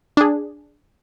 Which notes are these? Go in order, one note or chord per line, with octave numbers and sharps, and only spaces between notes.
D4 G#4